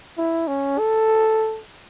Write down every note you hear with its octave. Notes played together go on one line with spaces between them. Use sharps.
E4
C#4
A4